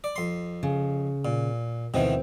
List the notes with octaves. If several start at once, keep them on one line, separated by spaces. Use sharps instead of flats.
D5
F2 C6
C#3
A#2
D2 B2 D#3 E3 C4